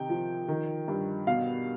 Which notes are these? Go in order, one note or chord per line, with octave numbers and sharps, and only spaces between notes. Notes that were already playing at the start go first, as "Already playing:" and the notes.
Already playing: C3 D#3 G5
F3
D#3
G2
B2 F5